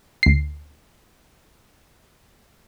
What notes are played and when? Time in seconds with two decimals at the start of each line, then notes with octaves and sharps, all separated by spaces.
0.23 D2 C7